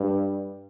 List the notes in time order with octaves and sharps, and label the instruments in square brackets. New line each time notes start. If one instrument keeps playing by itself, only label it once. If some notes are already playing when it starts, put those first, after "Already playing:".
Already playing: [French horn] G2